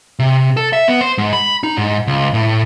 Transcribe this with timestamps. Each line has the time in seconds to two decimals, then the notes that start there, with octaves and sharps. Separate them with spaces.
0.19 C3
0.57 A4
0.73 E5
0.88 B3
1.01 C5
1.18 G#2
1.33 B5
1.63 D#4
1.78 G#2
2.07 C#2
2.34 A2